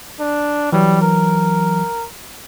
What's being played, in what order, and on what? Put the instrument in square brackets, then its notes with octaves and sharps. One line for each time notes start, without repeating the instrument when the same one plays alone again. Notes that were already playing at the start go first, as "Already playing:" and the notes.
[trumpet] D4
[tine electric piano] E3 F#3 [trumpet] G3
[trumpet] A#4